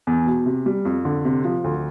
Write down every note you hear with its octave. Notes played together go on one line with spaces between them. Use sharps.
E2
B2
C3
G3
F2
D3
C3
F3
D2